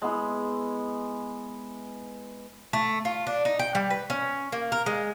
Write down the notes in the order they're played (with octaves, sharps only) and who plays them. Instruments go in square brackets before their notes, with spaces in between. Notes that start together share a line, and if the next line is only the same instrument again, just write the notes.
[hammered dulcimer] G#3 B3 E4
[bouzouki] A3
F4
D4
D#4
G5
G3
B4
C#4
A#3
A#4
G#3